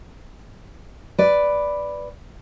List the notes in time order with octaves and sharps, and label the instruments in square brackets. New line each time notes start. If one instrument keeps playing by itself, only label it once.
[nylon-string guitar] B4 D5